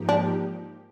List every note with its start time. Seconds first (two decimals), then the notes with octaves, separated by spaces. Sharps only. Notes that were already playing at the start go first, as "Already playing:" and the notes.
Already playing: G#2 F3 A#3 D#4 G4
0.09 D4